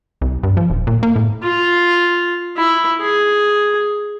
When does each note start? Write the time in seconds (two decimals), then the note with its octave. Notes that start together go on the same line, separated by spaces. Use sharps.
0.21 C2
0.43 G2
0.57 F3
0.70 D#1
0.87 A#2
1.03 A#3
1.16 A2
1.43 F4
2.57 E4
3.01 G#4